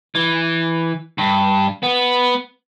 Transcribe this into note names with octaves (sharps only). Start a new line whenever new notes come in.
E3
G2
B3